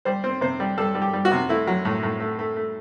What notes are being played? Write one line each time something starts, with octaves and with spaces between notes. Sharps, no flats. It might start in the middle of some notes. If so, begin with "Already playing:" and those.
G3 C5
C4
C3 C5
G3
G3 A4
G3
G4
G3
F#4
C3
A3 E4
F#3
A2
A2
A3
A3
A3